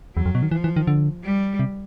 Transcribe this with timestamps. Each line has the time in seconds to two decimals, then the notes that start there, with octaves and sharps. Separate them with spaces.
0.16 E2 F#3
0.26 F2
0.35 B2
0.43 D#3
0.51 E3 F3
0.64 E3
0.76 D#3
0.87 D3
1.24 G3
1.59 C3